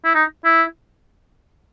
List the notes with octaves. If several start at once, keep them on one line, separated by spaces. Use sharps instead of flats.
E4
D#4
E4